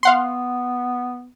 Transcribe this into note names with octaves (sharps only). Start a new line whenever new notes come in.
B3 F5 F#5 C6